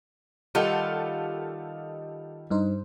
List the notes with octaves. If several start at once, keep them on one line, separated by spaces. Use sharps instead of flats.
D#3 G3 F4 A4 F#5
G2 D#4 C5